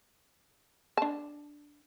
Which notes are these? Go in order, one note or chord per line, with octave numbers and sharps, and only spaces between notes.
D4 A5